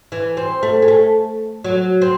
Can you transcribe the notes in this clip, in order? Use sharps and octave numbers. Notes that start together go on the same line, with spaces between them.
E3
C4
A3
G#3
A3
F#3
C4